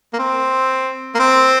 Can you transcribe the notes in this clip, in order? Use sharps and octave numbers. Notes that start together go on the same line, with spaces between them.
A#3
C4
A#3
C4